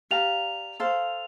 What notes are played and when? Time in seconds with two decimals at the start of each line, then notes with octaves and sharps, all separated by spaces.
0.11 G4 D5 F5 A#5 F7
0.80 A4 C5 F5